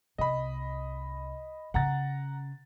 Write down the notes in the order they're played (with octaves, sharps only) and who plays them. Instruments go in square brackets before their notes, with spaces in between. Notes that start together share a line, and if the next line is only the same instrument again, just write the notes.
[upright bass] C2 [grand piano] D#5 B5
[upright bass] C#3 C#4 [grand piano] F#5 A#5 A6